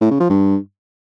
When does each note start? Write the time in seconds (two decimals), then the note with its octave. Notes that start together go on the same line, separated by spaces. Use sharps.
0.01 A2
0.11 C#3
0.20 F3
0.30 G2